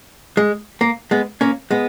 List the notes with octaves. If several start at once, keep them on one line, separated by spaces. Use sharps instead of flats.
G#3
A#3
G#3 B3
A#3 C#4
G#3 B3